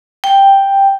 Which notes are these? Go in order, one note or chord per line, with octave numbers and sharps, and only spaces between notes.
G5